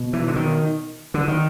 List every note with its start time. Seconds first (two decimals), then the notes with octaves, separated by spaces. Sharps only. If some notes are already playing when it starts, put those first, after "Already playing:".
Already playing: B2
0.13 E3
0.28 D3
0.36 D#3
1.14 D3
1.28 D#3